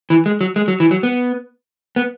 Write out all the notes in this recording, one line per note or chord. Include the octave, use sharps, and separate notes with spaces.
E3
G#3
F#3
G#3
F#3
E3
F#3
B3
B3